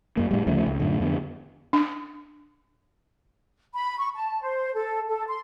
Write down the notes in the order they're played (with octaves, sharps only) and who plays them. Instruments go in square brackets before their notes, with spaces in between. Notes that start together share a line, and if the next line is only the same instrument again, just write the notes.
[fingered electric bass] F#2 A#3
A2 G3
D2 C#3 F3 A3
C#2
F#2 A2 D3
F2 D3 B3
[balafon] D4
[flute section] B5
C#6
A5
C5
A4
A4
C6